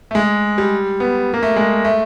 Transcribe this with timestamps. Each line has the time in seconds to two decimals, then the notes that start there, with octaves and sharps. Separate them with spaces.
0.11 A3
0.15 G#3
0.58 G3
1.00 B3
1.34 A#3
1.43 A3
1.56 G#3
1.85 A3